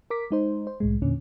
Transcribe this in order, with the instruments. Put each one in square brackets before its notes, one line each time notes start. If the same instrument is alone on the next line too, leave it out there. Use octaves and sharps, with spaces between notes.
[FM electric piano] A#4 D6 B6
G#3 D#4 C5
C5
C2 A2 G#3
E2 A#2 D3 C#4